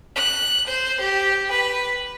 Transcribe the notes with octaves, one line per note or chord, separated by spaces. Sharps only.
F#6
C5
G4
B4